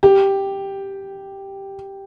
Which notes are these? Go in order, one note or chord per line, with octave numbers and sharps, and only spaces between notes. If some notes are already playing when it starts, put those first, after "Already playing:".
G4